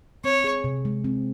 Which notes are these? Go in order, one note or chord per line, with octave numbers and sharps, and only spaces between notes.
C4 C#5
G#4
C3
G#3
C4